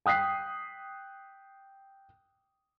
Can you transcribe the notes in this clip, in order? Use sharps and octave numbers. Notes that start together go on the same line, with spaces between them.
G5 D#6 F#6 B6 C7